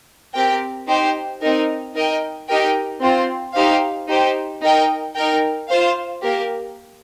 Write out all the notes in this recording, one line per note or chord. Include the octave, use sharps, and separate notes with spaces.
C4 G4 A#4 G5
D#4 G4 C5
C4 D#4 A#4
D#4 A#4 D#5 G5
D#4 G4 A#4 D#5 G5
C4 F4 C5
D#4 G4 C5 F5
D#4 G4 C5
D#4 A#4 D#5 G5
D#4 A#4 G5
F4 C5 F5
A#3 G4 A#4